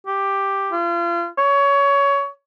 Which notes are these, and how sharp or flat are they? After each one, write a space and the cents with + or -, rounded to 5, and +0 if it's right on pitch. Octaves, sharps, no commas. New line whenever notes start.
G4 +5
F4 -35
C#5 +20